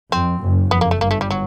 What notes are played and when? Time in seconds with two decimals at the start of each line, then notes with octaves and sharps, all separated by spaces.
0.12 F2 C4
0.41 F#1 F#2
0.71 F2 B3
0.81 A#3
0.91 A3
1.01 G1 G2 A#3
1.11 A3
1.21 G3
1.31 F#3